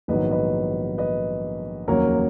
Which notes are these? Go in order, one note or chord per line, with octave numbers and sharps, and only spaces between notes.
A#1 G#2 D#3 F#3 B3 B4 D#5
B4 D#5
B4 D#5
F1 D#2 C#3 F#3 A#3 A#4 C#5